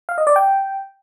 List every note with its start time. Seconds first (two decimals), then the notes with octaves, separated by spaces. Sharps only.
0.09 F5
0.18 D#5
0.27 D5
0.36 G5